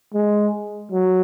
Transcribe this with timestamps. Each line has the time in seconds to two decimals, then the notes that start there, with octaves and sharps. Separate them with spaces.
0.14 G#3
0.92 F#3